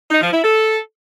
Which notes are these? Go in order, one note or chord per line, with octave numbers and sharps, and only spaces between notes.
D#4
F3
E4
A4